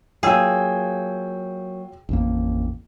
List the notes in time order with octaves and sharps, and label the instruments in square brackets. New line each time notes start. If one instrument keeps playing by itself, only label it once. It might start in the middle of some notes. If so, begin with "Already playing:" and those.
[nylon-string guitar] F#3 A#3 [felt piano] F4 G5 E6 [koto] G#4
[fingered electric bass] A1 F2 A#3